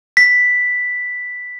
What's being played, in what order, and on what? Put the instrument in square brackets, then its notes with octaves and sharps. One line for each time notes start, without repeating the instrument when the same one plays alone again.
[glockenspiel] B6